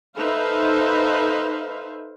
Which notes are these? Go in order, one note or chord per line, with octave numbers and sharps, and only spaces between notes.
D#4 A4 B4 C5 E5 F5